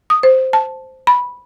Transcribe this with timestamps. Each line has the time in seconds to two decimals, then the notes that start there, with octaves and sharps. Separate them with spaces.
0.10 D#6
0.23 C5
0.53 A5
1.07 B5